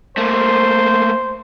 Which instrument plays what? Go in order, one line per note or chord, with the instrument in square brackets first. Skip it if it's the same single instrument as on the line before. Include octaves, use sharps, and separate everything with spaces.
[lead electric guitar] A3 A#3 [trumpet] C5